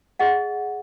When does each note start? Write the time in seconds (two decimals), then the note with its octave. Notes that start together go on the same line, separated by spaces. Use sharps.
0.19 G#4 D#5 F#5